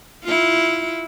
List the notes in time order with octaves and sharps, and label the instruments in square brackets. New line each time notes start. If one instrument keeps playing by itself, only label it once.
[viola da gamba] E4 F4